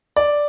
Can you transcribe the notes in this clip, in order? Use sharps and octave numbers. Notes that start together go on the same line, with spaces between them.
D5